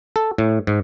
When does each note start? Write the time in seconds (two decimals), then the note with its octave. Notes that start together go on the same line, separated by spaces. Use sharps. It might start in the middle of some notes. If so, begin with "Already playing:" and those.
0.16 A4
0.38 A2
0.67 G#2